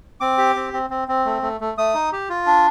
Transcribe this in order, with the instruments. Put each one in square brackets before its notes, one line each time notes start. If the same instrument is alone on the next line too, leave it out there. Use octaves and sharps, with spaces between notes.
[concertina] C4 D6
G4
C4
C4
C4
C4
A3
A3
A3
A3 D#6
D#4
G4
F4
D4